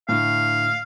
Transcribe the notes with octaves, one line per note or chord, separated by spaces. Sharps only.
A2 D3 F5